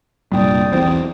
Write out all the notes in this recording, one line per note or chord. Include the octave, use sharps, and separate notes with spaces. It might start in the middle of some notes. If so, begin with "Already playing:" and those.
F1 G2 A#2 D5 G5 D#6
E1 B1 E2 C4 C5